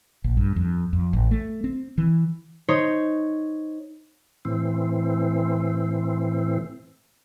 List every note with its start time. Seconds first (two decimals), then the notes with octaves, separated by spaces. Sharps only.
0.24 A#1
0.37 G2
0.56 F2
0.93 F2
1.13 A1
1.31 A3
1.64 C4
1.98 E3
2.68 D#4 C5 C#5
4.45 A2 E3 C4